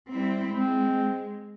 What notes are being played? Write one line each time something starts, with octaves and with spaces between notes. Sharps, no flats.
G3 C4 E4
G#3 C4